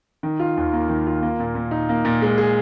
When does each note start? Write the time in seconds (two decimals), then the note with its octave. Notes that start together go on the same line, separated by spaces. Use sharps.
0.23 D#3
0.39 F4
0.57 D#2
0.73 A#3
0.89 D#3
1.07 F4
1.22 A#3
1.40 A#2
1.55 A#2
1.71 D#4
1.89 A#3
2.05 A#2
2.22 G#3
2.38 G#4